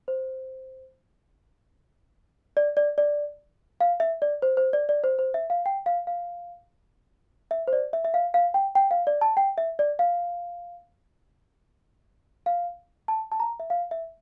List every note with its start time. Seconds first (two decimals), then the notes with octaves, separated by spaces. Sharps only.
0.08 C5
2.57 D5
2.77 D5
2.98 D5
3.81 F5
4.00 E5
4.22 D5
4.42 C5
4.57 C5
4.73 D5
4.89 D5
5.04 C5
5.19 C5
5.34 E5
5.50 F5
5.66 G5
5.86 F5
6.07 F5
7.51 E5
7.68 C5
7.73 D5
7.93 E5
8.05 E5
8.14 F5
8.34 F5
8.54 G5
8.75 G5
8.91 F5
9.07 D5
9.21 A5
9.37 G5
9.58 E5
9.79 D5
9.99 F5
12.46 F5
13.08 A5
13.32 A5
13.40 A#5
13.60 E5
13.70 F5
13.91 E5